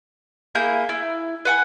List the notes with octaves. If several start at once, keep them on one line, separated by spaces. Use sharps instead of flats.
A#3 E4 G#4 G6
E4
B4 F#5 G#5